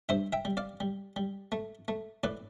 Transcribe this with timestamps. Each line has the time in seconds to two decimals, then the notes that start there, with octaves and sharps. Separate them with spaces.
0.09 G2 C5 E5
0.33 E5 G5
0.45 G3
0.57 D5 F5
0.80 G3
1.16 G3
1.52 A3
1.88 A3
2.23 A2 B4 D5